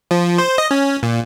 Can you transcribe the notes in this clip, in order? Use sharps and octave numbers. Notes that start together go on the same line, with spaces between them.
F3
C5
D#5
C#4
A#2